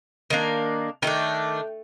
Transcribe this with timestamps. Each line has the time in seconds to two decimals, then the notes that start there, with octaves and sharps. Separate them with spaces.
0.30 D#3 A#3 D4
1.02 D#3 A3 D4 G5